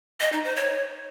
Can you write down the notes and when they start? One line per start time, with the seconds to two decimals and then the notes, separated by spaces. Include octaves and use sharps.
0.20 D#5
0.32 D#4
0.44 C5
0.56 C#5